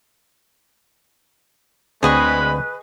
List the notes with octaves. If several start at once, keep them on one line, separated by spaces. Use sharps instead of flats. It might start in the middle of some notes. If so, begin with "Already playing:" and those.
D2 G#3 C4 G#4 B4 D#5 B5 C#6